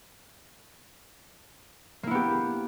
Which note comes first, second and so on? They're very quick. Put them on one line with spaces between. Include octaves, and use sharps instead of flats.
A#3 E4 B3 G4